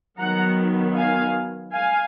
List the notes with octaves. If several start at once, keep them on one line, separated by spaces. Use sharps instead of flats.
D#3 F#3 B3 F#5 A#5
F5 G#5
F5 G#5